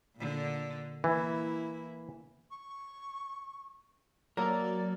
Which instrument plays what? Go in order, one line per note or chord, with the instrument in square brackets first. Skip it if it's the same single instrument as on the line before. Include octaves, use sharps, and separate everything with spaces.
[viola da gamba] A#2 D3
[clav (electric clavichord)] E3 [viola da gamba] A#3 E4
[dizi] C#6
[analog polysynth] F#3 [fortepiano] A#3 A4 [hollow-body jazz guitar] A#4 [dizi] D5